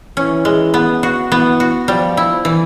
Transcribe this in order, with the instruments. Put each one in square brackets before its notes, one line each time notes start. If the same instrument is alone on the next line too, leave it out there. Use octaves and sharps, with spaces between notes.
[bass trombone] E3 [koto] C#4
[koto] G#3
B3
F#4
[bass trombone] E3 [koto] B3
[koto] F#4
[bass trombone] F3 [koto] G3
[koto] E4
E3